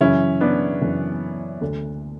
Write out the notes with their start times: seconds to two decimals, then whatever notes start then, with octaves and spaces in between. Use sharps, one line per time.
0.01 F#2 C#3 E3 C#4 E4
0.41 B3 D4
0.81 F#2 C#3 E3
1.61 D2 D3